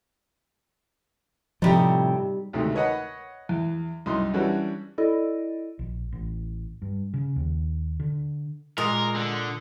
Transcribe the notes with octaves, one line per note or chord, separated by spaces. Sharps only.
A2 C3 F3 G3 D#4
D2 G#2 C3 D#3 A3
B4 C#5 D#5 F#5 B5
E2
C2 F#2 D#4 C6
E3 G3 C#4 D4 F#4
E4 A4 D5 D#5
A#1
A1
G2
C#3
D#2
D3
A#2 G#3 A#4 D#6 F7
D3